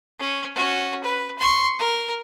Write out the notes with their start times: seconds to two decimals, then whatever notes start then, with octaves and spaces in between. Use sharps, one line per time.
0.19 C#4
0.55 C#4 F#4
1.04 B4
1.39 C6 C#6
1.79 A#4